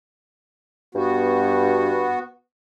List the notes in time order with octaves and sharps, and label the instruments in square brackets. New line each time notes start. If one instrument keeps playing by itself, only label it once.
[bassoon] G2 [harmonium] B3 F#4